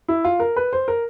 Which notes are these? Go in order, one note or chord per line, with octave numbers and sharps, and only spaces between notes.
E4
F4
A#4
B4
C5
A#4